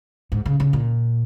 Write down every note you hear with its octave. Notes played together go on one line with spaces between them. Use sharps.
G#2
C#3
C#3
A#2